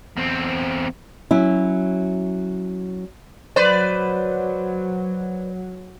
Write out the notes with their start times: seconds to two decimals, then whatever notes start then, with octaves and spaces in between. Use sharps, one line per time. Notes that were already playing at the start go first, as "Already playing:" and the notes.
0.17 E2 C4
1.31 F#3 C#4 E4
3.56 F#3 B4 C5 D5